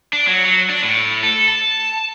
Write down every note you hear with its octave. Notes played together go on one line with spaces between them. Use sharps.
D4
F#3
F#3
D4
A2
A4
A5